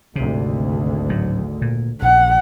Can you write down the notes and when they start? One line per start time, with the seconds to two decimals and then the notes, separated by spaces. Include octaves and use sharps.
0.16 G#1 D2 C3
1.09 A2 F#3
1.62 A#2
2.02 A#1 F#5